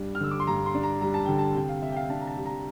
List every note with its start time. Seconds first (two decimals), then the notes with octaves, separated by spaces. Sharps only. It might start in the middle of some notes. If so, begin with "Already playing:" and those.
Already playing: G2 G3 D4
0.15 F6
0.21 D3 E6
0.31 D6
0.40 C6
0.47 G2 A#5
0.66 C6
0.74 D4
0.83 A#5
1.01 G3 A#5
1.14 A5
1.26 D3 G5
1.38 A5
1.55 C3 G5
1.69 F5
1.82 C3 E5
1.92 G5
1.96 F5
2.04 G5
2.10 D4 A5
2.21 A#5
2.27 A5
2.36 G3
2.46 A#5